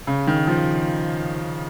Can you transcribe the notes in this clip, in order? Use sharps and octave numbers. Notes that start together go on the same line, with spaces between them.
C#3
D#3
F3